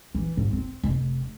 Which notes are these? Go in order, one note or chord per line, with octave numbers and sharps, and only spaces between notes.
E3
G#2
C4
F1